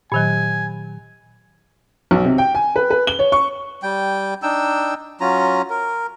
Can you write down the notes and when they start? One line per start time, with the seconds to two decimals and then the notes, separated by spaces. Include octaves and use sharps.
0.12 A#2 D#3 F#3 G#5
2.11 B1
2.24 C3
2.38 G5
2.55 G#5
2.76 B4
2.90 B4
3.07 G7
3.19 C#5
3.32 C#6
3.83 G3 G5
4.42 D4 D#4 G5 E6
5.20 F#3 C#4 F4 A#5
5.70 A#4